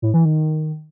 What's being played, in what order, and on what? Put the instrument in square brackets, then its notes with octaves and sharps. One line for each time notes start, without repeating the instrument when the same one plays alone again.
[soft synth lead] A2
E3
D#3